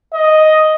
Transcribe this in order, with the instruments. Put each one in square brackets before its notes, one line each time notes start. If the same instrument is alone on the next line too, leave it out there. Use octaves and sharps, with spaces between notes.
[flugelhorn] D#5